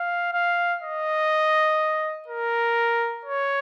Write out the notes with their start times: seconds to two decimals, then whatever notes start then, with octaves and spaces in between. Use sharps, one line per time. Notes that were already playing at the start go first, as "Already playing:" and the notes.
Already playing: F5
0.34 F5
0.83 D#5
2.28 A#4
3.25 C#5